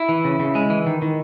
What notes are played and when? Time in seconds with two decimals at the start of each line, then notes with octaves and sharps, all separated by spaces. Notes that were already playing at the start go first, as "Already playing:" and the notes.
Already playing: E4
0.09 E3
0.25 C#3
0.40 C#3
0.55 G#3
0.70 E3
0.86 D#3
1.02 D#3